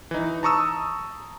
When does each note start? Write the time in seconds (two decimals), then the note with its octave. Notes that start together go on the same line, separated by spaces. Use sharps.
0.11 E3 D#4
0.43 A5 A#5 C#6 D#6 E6